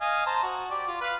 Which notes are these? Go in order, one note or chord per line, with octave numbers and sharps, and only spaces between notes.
D#5 F5 G#5
C5 A5 A#5
F#4
G4 D5
F4
B4 F5